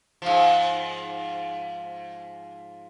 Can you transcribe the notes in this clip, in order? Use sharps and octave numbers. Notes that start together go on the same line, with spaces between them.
G#2 F3